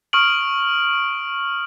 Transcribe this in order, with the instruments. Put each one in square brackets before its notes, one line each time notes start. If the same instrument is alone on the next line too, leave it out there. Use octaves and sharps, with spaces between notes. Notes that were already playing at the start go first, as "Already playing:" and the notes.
[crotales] C#6 D#6 F6 D7 F#7